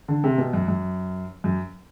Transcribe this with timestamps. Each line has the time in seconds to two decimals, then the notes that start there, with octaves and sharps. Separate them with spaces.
0.08 D3
0.24 C3
0.38 B2
0.53 F#2
0.68 F#2
1.44 F#2